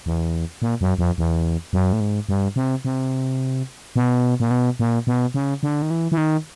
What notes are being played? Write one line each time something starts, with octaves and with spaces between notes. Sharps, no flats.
E2
A#2
F#2
F2
E2
F#2
A2
G#2
G2
C3
C3
B2
A#2
B2
A#2
B2
C#3
D3
D#3
E3
E3
D#3